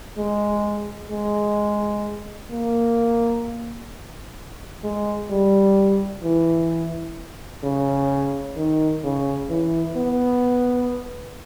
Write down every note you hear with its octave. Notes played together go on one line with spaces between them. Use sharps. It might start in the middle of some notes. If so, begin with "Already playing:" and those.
G#3
G#3
A#3
G#3
G3
E3
C#3
D#3
C#3
E3
B3